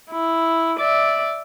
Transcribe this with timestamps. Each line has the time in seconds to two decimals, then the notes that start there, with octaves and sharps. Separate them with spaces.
0.11 E4
0.79 D5 E5